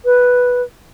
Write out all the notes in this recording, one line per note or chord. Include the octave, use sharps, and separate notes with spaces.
B4